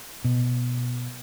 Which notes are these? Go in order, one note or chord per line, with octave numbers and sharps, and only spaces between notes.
B2